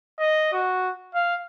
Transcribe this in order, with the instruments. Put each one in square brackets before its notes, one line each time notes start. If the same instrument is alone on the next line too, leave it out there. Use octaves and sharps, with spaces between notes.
[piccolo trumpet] D#5
F#4
F5